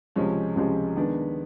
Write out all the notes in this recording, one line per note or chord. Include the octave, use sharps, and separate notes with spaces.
C#2 C3 F3 G#3 C#4
C#2 C3 F3 G#3 C#4
D#3 G#3 B3 D4